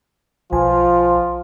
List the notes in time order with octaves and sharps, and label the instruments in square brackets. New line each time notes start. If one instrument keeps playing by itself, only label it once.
[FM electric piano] B1 G#5 [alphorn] F3 [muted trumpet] F4